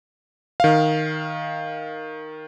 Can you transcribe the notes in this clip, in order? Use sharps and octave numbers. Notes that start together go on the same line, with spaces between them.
D#3 F5